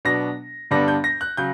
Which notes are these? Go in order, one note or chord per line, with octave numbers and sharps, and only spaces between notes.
B2 F#3 B3 D4 A#6
G2 D3 G3 B3 D4 A#6
G6
A#6
F#6
C#3 F#3 G6